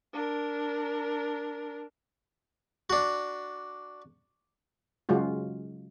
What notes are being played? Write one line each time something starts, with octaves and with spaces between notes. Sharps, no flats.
D4 A#4
D4 F#4
C#3 F#3 G#3 F4 F#4